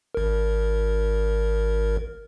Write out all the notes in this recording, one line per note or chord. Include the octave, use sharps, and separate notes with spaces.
G#1 A#4